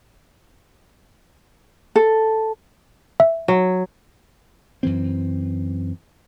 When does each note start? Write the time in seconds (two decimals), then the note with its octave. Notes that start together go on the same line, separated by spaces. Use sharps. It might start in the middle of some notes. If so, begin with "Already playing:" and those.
1.96 A4
3.20 E5
3.48 F#3
4.83 F#2 E3 C4